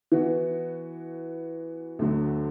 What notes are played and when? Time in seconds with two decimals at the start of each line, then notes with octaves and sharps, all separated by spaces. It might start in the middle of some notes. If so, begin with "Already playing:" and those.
0.12 E3 B3 F#4
1.99 D2 D3 F#3